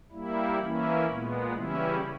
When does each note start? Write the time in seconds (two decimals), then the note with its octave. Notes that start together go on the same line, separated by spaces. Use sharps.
0.12 G3 A#3 E4
0.60 E3 A#3 C#4 E4
1.06 A#2 G#3 B3
1.54 C#3 E3 G3 C#4 E4